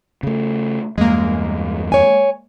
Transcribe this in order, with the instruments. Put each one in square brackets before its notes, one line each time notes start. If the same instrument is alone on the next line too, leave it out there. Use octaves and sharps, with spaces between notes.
[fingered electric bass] C#3 A3
[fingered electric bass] E2 G2 [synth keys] G#3 A#3
[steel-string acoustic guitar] C#5 G#5